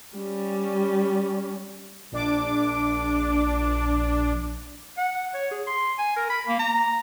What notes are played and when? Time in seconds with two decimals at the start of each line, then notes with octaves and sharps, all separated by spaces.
0.17 G3 C#4
2.12 A#1 D4 D6
4.98 F#5
5.34 C#5
5.51 G#4
5.67 C6
5.99 G#5
6.16 A#4
6.30 B5
6.47 A#3
6.59 A#5